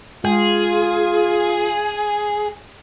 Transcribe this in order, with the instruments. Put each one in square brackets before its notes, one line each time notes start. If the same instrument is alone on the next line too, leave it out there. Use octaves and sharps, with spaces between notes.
[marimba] G#3 [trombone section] F4 [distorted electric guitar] G#4